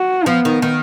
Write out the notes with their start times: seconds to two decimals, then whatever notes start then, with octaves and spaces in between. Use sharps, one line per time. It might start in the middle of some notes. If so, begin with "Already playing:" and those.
Already playing: F#4
0.26 F3 B3
0.45 D#3
0.62 D#3